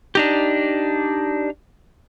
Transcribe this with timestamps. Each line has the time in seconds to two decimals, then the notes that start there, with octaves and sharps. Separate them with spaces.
0.15 D4 D#4 G4